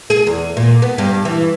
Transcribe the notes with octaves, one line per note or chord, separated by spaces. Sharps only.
G#4
E2
A#2
B3
G2
E3